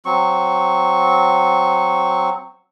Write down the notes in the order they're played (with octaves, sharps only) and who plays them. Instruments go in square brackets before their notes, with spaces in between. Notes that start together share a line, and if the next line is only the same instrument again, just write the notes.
[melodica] F#3 C4 C#6